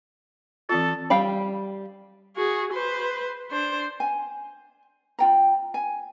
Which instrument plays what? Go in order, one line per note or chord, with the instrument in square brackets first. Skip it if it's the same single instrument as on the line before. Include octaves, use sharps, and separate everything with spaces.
[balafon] E3 C4 F4 [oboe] A4
[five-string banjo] G3 F5 G5 B5
[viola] F#4 G#4
B4 C5
D4 C5
[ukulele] G#5
F4 G5 A#5
G#5